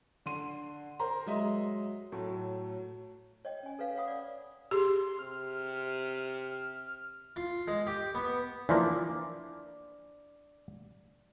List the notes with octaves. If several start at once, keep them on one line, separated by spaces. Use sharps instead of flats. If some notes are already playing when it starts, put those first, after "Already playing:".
D3 C6 D#7
A#4 C5 A#5 C6
F#3 G#3 D#5 E5
A2 F#3 A3
C#5 D#5 G5
C#4 G#5
A4 B4 C#5 F5
C#5 F5 F#5 B5 D6 D#6
D5
G4 G#4 C6
C3 F6
F4
G#3
G4
B3
E3 F3 A#3 D5